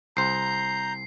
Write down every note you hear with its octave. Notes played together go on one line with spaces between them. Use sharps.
C2 C5 A#5 G6 C7